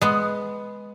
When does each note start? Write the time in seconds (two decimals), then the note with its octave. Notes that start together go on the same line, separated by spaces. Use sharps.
0.02 G#3 B3